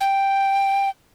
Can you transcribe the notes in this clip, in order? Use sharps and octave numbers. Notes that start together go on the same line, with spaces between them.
G5